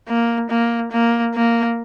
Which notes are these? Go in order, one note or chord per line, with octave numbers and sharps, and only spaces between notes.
A#3
A#3
A#3
A#3